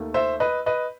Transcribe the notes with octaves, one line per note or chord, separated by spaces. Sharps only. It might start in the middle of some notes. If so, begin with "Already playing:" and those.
Already playing: D#2 D#3 A3
C5 E5
B4 D#5
B4 D#5